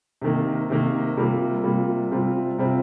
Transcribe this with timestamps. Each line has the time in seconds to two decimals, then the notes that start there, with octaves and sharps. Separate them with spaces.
0.22 C3 D#3 A#3
0.70 C3 D#3 A#3
1.17 C3 G3 A#3 F4
1.64 C3 G3 A#3 F4
2.11 C3 G3 C4 F4
2.58 C3 G3 C4 F4